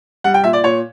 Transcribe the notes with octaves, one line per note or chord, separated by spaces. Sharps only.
G3 F#5
G5
A#2 E5
D5
A#2 C#5